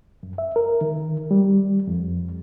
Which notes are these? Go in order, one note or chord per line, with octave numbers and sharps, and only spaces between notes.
F#2
E5
A#4
D#3
G3
F2